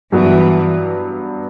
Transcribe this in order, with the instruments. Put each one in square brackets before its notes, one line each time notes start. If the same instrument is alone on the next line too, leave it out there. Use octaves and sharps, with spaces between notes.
[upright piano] G2 F#3 B3 F#4 B4 [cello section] E3